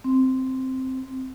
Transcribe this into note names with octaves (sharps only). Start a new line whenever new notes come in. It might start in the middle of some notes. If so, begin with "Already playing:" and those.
C4